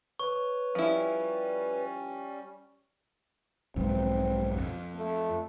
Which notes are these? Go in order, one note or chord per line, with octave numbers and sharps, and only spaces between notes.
B4 C#5 C#6
F3 G3 C#4 E4
B1 F2 G#2 C4
F2
A3